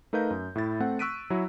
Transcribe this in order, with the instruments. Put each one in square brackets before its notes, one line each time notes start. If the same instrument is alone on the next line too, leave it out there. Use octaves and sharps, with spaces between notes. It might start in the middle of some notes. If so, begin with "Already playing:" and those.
[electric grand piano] A3 D#4 A#4 B4 F5 G6
F#2
A2 E4 A6
A3 C4 F#5
C#6 E6 F#6 B6 D7 D#7
F#3 E4 F#4